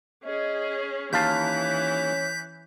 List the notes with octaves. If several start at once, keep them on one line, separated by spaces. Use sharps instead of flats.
C#4 G#4 D#5
D#2 E3 C#4 F5 A5 G6 B6